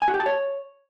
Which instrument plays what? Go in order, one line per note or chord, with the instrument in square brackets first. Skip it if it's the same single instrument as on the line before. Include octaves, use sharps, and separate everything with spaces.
[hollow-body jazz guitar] G#5
F#4
G4
A5
C#5